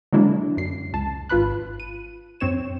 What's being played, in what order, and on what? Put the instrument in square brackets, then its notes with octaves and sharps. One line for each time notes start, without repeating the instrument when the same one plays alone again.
[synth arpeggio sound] D3 F#3 G#3 A#3 D4 E4
F#2 C7
C#2 A5
G#1 F4 B4 B5 F#6
D#7
F#2 C4 C#5 E7